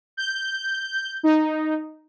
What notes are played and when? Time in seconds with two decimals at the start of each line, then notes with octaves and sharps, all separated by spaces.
0.17 G6
1.23 D#4